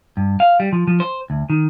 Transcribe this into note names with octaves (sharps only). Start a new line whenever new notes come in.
G2
F5
G3
F3
F3
C5
D2
D#3